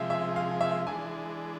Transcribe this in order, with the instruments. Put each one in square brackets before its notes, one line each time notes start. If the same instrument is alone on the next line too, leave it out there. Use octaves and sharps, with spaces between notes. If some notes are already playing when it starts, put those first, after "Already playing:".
Already playing: [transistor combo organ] C3 F3 G#3 [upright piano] E5 F5
[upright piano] E5
F5
E5
[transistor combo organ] E3 G#3 D4 [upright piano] G#5